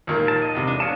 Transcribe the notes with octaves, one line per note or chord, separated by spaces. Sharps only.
D#2 A#2 D#3
A5
D#5
E2 C3
D4
B3 C#5 F5 A5